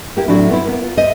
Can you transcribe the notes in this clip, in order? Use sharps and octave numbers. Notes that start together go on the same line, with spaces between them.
A#3 E4 G4
A2 F#3 C4 D4 E4
B3 C4 E4
A#3 B3
F4
C5 D#5 E5